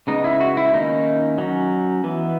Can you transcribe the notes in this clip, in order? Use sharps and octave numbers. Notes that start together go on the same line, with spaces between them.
C#3 G#3 B3 D#4
E4
F#4
E4
D#3 A#3 C#4 D#4
F#3 C#4
E3 B3